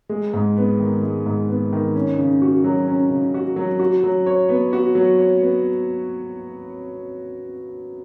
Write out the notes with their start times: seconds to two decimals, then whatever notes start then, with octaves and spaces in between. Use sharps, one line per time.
0.09 G#3
0.33 G#2
0.57 B3
0.79 D#3
1.02 G#3
1.26 G#2
1.49 B3
1.73 D#3
1.96 C#4
2.18 C#3
2.42 F#4
2.64 F#3
2.87 C#4
3.10 C#3
3.34 F#4
3.56 F#3
3.79 F#4
4.04 F#3
4.26 C#5
4.49 B3
4.73 F#4
4.95 F#3
5.19 C#5
5.42 B3